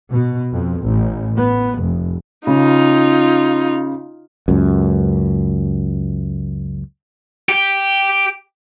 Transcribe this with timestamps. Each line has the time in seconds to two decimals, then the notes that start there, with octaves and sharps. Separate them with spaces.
0.11 B2
0.51 F2
0.81 A1
1.37 B3
1.79 F1
2.47 C#3 D#4 F4
4.48 C#2 F#2
7.49 G4